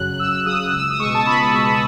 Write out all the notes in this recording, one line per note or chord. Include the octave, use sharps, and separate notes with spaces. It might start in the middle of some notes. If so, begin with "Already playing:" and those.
Already playing: F#2 C#3 F#3 F#6
F#2 E6
C#3 F#3 D#6
C#2 E6
D#6
B2 G#3 C#6
A5
C#2 B5
B2 G#3